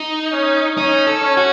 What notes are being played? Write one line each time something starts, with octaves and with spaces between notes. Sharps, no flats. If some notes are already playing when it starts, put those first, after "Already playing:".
Already playing: D#4
C#4
C#4 D#4
A4
C#4
F#4